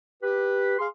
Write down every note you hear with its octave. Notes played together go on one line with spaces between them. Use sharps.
G4 B4
G#4 F5 C6